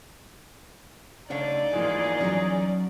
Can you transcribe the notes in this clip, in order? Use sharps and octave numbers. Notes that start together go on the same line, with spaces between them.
D2 C#3 D4 D#4 C#5 D5 F5
G#2 E3 F3 A#3 G#4
E2 F3 F#3 C#4